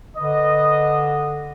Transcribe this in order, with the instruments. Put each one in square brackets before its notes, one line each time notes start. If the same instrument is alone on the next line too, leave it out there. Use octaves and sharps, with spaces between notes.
[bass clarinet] D3 [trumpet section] B4 D#5